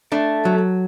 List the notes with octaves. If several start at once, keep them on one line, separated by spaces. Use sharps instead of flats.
A3 D4
F#3